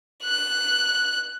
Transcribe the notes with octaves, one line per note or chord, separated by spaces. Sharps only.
F#6